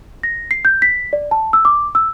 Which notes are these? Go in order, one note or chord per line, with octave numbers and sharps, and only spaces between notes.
A#6
C7
G6
B6
D5
A5
E6
D6
E6